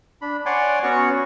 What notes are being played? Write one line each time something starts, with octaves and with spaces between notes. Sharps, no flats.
D4 B5
C#5 D5 F#5 G#5 C6 D6
B3 C#4 F#4 C#5 F#5 C#6